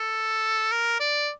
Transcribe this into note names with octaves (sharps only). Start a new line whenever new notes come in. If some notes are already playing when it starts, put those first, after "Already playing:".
Already playing: A4
A#4
D5